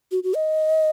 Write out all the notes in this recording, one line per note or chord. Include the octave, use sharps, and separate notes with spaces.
F#4
F#4
D#5